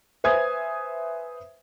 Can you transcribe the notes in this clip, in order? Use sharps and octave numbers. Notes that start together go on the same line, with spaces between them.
B4 C5 E5 G#5 D#6 G#6